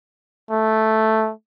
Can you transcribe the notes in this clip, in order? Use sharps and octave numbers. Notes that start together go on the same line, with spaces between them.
A3